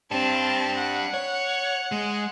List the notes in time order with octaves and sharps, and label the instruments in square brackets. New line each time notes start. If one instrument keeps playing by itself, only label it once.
[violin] C4 A5 [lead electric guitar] D4 G4
[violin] F#5
[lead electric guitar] C#5
G#3